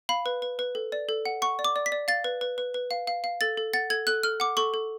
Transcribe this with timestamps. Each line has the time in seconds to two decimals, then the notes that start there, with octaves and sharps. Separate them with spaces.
0.09 F5 B5
0.26 B4
0.42 B4
0.59 B4
0.75 A4
0.92 D5
1.09 A4
1.26 F#5
1.42 F#5 C#6
1.59 D5
1.64 D6
1.76 D5
1.86 B6
1.92 D5
2.08 F5 A6
2.24 B4
2.41 B4
2.58 B4
2.74 B4
2.91 F5
3.07 F5
3.24 F5
3.41 A4 A6
3.57 A4
3.74 F#5 A6
3.90 A4 G#6
4.07 A4 F#6
4.23 A4 F6
4.40 F#5 D6
4.57 A4 C#6
4.74 A4